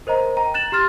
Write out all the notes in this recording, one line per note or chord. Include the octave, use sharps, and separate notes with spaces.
A#4 C5 D#5 A#5
G5 A#5
F#6 A6 E7 F#7
G4 C6 F6 A6